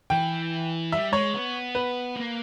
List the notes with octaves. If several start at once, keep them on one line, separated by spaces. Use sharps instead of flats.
E3 G5
G3 E5
G#3 C#5
B3
B4
A#3